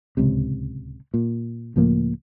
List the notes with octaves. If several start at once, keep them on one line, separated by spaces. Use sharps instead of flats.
D1 C#2 C3
A#2
C#2 A2 F3 A#3